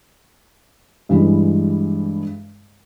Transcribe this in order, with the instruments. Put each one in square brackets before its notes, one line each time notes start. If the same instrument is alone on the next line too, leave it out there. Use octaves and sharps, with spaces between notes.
[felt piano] G2 E3 G3 G#3